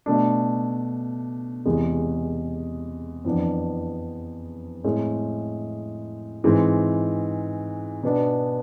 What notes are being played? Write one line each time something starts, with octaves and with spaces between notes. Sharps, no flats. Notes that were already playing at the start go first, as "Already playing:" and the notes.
B2 A3 D4
E2 C3 G#3
F2 E3 B3 D4
A2 G#3 C4
G#2 E3 G#3 C4
B2 B3 D4